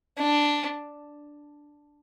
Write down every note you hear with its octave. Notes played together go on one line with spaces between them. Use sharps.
D4